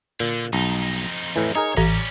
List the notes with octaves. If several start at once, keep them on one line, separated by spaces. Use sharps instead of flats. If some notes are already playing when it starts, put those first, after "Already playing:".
A#2 D3
B1 F2 D#4
A2 E3
D#4 G#4 A#4 C#5
A1 G3 C#4 A#5